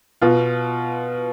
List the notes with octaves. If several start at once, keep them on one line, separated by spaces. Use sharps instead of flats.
B2 F4